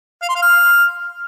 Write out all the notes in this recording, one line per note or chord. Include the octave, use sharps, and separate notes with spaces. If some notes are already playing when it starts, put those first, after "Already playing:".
F5
C6
F5
F6